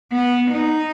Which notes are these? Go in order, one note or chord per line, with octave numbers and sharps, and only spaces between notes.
B3
D#4